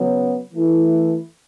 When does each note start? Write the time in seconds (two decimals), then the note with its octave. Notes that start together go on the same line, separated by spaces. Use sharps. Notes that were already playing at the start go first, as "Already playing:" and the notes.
Already playing: C#3 F#3 B3
0.53 E3 A3 E4